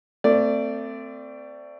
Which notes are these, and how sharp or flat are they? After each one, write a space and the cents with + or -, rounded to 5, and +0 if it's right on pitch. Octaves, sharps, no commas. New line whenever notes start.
A3 +30 C4 -15 D5 +0